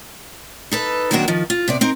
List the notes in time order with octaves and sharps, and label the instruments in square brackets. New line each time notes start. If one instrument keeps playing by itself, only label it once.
[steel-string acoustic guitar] D#4 A4 B4
D#3 F#3 A#3 C4 D4 F#4
D#3 F3
F4
C3 B3 D5
C4 D#4 A#4